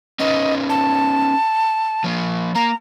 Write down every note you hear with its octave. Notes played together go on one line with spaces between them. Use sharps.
C#4 D#4 B4 D#5
A5
F3 A#3
A#3 A#5